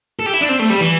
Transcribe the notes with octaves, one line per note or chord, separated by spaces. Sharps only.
A4
G4
E4
D4
C4
A3
G3
E3